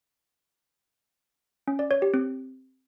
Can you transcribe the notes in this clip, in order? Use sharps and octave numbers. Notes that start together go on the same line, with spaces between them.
C#4
D5
C#5
G4
C4